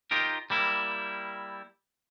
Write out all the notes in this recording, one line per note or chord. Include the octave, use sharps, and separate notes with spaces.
D#4 F4 G4 A#4
G3 A#3 E4